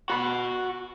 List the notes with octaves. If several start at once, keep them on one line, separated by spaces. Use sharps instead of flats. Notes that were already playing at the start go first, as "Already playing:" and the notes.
F#4 B5